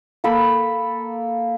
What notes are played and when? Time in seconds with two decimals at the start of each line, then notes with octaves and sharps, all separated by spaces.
0.24 A#3 A4 B5